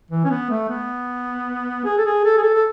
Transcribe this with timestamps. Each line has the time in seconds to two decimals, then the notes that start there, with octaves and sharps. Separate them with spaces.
0.10 E3
0.25 C#4
0.30 B3
0.50 A3
0.69 B3
1.85 G#4
1.98 A4
2.05 G#4
2.25 A4
2.37 G#4
2.43 A4
2.54 A4